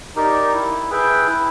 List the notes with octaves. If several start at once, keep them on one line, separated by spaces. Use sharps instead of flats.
D#4 G4 A#4 D5
E4
G#4 B4 E5 G5
E4